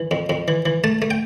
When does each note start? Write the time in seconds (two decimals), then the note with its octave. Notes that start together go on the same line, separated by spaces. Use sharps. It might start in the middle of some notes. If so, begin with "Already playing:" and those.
Already playing: E3
0.11 F2
0.30 F2
0.48 E3
0.66 E3
0.84 A3 A5
1.02 A3
1.11 G5